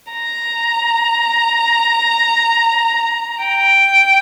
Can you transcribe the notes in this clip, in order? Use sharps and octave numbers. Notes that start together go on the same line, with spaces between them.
A#5
G5